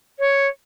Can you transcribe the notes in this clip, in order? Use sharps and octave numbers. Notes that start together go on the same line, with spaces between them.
C#5